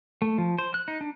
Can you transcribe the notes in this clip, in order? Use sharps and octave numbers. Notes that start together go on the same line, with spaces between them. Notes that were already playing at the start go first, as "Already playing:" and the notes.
A3
F3
C5
F#6
D#4
D4